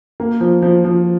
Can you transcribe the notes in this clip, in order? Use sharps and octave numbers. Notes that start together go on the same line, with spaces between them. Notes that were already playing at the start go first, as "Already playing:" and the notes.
A#3
F3
F3
F3